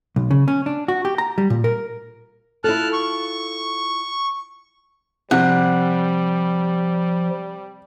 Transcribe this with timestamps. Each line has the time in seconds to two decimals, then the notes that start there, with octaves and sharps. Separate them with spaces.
0.16 B1
0.31 C#3
0.48 C#4
0.66 D4
0.88 F#4
1.05 G4
1.18 A#5
1.38 G3
1.50 A#2
1.64 A#4
2.64 E4 F4 A4 A5 F6 F#6
2.93 C#6
5.31 C3 F3 G3 F#5